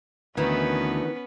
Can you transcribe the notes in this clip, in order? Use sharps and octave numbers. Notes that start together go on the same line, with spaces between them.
D2 D#3 E3 B3 C#4 B4